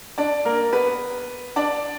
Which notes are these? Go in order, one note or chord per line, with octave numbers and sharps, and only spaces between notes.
D4 D5
A#3 A#4
B3 B4
D4 D5